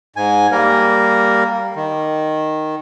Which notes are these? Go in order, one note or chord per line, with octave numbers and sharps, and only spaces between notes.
G#2 G#5
G3 A#3 A#4
D#3